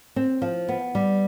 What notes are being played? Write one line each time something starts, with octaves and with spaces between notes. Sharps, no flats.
C4
F3
B3
G3